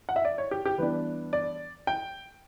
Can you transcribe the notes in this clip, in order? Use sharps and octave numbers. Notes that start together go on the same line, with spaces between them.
F#5
E5
D5
C#5
G4
G4
E3 G3 B3 D4 B4
D5
G5